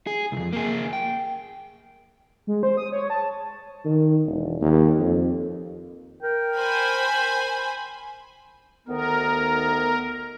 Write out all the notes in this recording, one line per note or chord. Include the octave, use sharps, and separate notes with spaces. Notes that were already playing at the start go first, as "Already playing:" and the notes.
G#4
C2 F2
A#3 G#4
G5
G#3
C5
D#6
C#5
A5
D#3
E1
D#2
F2
A#4 G5
C5 G#5 B5
D2 D#3 B3 A#4